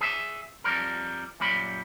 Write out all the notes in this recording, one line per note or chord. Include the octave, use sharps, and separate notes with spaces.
G#4 E5
F2 G3 A#4
F#2 A#2 G3 B5